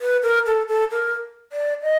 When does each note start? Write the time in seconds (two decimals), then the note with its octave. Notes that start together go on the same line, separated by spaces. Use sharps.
0.01 B4
0.23 A#4
0.46 A4
0.68 A4
0.91 A#4
1.52 D5
1.83 D#5